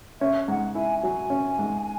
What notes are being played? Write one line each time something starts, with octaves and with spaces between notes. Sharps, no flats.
C#4 E5
G#2 F#5
E4 G#5
F#3 G#5
C#4
G#2